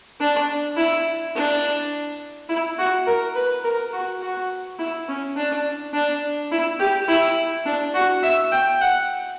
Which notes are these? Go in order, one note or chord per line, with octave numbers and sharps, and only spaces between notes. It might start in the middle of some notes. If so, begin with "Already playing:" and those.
D4
E4
D4
E4
F#4
A#4
B4
A#4
F#4
F#4
E4
C#4
D4
D4
E4
G4
E4
D4
F#4
E5
G5
F#5